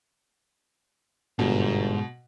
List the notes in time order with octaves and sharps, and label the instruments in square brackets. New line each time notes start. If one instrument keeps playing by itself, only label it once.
[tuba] G1 [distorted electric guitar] G#2 [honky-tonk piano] B2